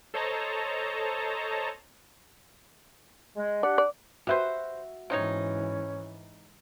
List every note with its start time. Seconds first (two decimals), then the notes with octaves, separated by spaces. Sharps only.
0.14 A4 C5 C#5 D#5 A5 A#5
3.36 G#3
3.63 D4 G4 D5 F#5
3.78 D5
4.27 F#4 G4 B4 C5 E5
5.10 G#2 C3 E3 C#4 D#4 C#5